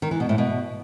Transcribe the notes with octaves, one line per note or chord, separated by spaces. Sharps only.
D#3
E3
B2
A2
B2